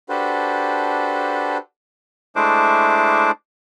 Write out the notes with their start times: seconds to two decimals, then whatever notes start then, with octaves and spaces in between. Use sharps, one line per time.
0.09 D4 F#4 G4 A4 B4 C5
2.36 G#3 A3 D4 E4 C5 D6